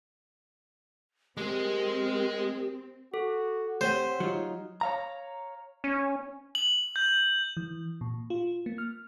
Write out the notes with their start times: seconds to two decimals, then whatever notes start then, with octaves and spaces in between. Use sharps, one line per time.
1.37 G#3 C4 G4 G#4 A#4
3.14 F#4 A4
3.81 C4 G4 C5 C#5 F#5
4.20 F#3 D#4 F4
4.81 C#5 F5 A#5
5.84 C#4
6.55 F#7
6.96 G6
7.57 E3
8.01 A#2
8.30 F4
8.66 A#3
8.78 F6